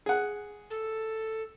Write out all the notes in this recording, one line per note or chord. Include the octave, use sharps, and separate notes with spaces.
G#4 F#5
A4